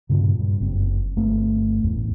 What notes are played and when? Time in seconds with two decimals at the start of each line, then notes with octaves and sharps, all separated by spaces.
0.09 G2 A#2 C#3
0.39 G2
0.60 F#1 C4
1.16 G1 A3 C4
1.84 A1 E2